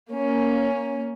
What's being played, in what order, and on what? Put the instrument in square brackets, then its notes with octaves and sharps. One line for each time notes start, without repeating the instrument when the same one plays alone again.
[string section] A#3 C#4